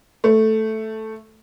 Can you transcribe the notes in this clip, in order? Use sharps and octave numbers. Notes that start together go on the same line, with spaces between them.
A3